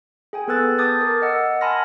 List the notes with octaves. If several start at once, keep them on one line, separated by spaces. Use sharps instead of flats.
G#4 G5 G#5
B3 A4 B4 E6 F#6 A6
A5 D6 D#6 G6 A6
A#4
D#5 F#5 E6
G#5 A5 B5 C6 F6 A#6